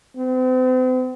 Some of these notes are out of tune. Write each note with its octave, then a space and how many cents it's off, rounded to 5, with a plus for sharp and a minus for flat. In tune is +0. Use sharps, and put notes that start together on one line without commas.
C4 -40